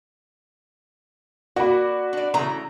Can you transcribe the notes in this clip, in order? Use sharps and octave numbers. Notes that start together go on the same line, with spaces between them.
A#3 F#4 A#4 D5 B5
D4 D5
C#3 E3 A3 A#5